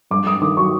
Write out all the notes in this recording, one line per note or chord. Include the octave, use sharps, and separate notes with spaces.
G2 D6
G2 D#6
D#3 D6
F#3 C#6